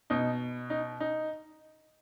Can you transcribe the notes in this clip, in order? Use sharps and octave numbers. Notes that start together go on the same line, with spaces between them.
B2 D#4
D#4
D#4